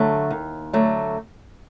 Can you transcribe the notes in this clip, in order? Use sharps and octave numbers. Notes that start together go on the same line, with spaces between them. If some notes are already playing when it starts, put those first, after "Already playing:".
Already playing: D3 F#3 A3
D#2
D3 F#3 A3